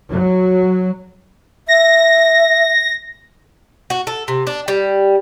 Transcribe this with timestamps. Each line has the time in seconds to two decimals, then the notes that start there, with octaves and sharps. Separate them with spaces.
0.11 F#3
1.68 E5 A#6
3.90 F#4
4.07 A4
4.28 C3
4.47 D4
4.68 G3